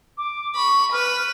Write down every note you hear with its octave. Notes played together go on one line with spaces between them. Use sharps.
D6
B5 C#6
B4 F6